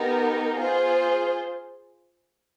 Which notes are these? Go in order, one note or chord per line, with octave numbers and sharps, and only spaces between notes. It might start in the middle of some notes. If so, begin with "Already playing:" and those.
Already playing: B3 D#4 G4 A#4
F4 G#4 C5